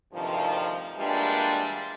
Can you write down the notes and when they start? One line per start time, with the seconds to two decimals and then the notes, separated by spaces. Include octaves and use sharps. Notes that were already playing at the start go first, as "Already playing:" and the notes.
0.13 D2 G2 C3 D#3 F3
0.98 E3 G3 G#3 A#3 D4 F4